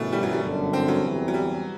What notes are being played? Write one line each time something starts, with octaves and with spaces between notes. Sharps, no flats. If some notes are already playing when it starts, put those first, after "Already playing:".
Already playing: G1 F#2 B2 E3 A3
G3
F#3
G3
G1 F#2 D3
C4
F#3
E2 C3 E3
F#3
G3